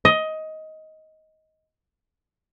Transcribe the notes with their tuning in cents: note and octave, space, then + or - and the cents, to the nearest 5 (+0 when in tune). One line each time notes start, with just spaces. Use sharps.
D#5 +15